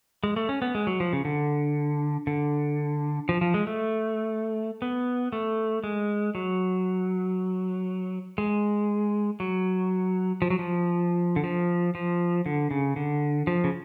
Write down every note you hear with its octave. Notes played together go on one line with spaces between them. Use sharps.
G#3
A3
C#4
B3
G#3
F#3
F3
C#3
D3
D3
F3
F3
G#3
A3
B3
A3
G#3
F#3
G#3
F#3
F3
F#3
F3
D3
F3
F3
D3
C#3
D3
F3
C#3